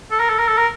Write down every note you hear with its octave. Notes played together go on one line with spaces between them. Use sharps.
A4
A#4
A4
A#4
A4
A#4